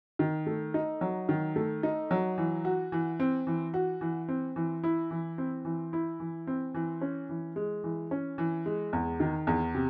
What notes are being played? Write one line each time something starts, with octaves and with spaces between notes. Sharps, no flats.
D#3
A3
D#4
F#3
D#3
A3
D#4
F#3
E3
F#4
E3
C4
E3
F#4
E3
C4
E3
E4
E3
C4
E3
E4
E3
C4
E3
C#4
E3
G#3
E3
C#4
E3
G#3
E2
D#3
E2
C3